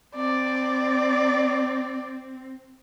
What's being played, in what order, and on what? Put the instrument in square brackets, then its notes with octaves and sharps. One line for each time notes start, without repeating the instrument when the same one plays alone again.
[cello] C4 [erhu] D5